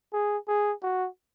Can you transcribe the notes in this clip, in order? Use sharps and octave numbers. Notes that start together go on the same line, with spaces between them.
G#4
G#4
F#4